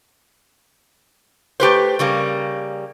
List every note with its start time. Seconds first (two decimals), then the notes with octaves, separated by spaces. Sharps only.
1.60 A3 G4 B4 C5
1.99 C#3 G3 A#3